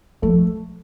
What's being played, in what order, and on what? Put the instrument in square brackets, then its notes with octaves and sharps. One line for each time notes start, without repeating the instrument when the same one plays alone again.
[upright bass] F3 [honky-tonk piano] A3